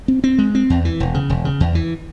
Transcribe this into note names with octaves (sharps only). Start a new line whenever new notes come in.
C4
C4
G#3
C4
E2
E3
E1
C#3
E1
C#3
E2
E3